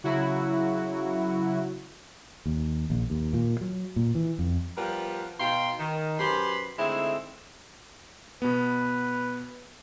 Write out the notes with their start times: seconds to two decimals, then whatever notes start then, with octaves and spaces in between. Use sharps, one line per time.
0.04 C#3 F#3 E4 F#4
2.46 D#2
2.90 A#1
3.10 D#2
3.33 A#2
3.61 F#3
3.96 A#2
4.15 E3
4.39 F2
4.77 F3 G3 B3 A#4 B4
5.39 B2 D#4 F5 G5 C6
5.80 D#3
6.19 F#2 G4 B4 C5 B5 C6
6.78 D3 G#3 A3 C4 D#4 E4
8.42 B2 B3 B4